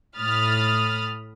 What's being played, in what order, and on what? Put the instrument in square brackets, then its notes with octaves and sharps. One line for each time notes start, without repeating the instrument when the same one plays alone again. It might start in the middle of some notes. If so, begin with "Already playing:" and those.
[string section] A2 B5 D#6 F6 A6